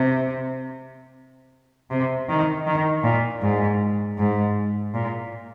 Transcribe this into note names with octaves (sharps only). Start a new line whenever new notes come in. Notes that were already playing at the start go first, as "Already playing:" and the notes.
Already playing: C3
C3
D#3
D#3
A#2
G#2
G#2
A#2